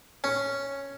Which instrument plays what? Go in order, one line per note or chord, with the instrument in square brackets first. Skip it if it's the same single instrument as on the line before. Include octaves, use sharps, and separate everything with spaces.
[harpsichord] C#4